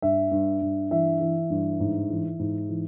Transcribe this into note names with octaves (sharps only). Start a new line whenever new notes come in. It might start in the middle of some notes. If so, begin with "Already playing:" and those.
G2 E5
G2
G2
E3 E5
E3
G2
G#2
E3
G#2
E3